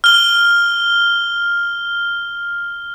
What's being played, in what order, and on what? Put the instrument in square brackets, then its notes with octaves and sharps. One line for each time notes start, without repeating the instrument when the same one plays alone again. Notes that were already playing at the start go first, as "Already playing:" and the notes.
[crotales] F6 G7